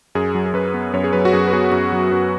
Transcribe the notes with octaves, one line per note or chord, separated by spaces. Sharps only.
F#2 G#4
F#3
G#4
F#2 B4
B3
F#2 C#5
G#4
F#3 B4
F#4
F#2 G#4
B4
B3 G#4
F#2 F#4
F#3
F#2